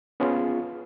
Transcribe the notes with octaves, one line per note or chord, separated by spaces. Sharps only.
B3 C#4 F4 G#4